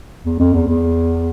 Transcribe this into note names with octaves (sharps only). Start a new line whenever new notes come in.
E2
F2
E2
E2